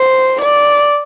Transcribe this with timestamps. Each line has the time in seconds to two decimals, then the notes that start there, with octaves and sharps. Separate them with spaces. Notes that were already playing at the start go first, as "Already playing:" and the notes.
Already playing: C5
0.41 D5